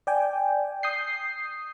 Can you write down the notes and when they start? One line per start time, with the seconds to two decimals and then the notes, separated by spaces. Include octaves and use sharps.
0.07 D5 G5 G#5
0.83 D#6 G6 C7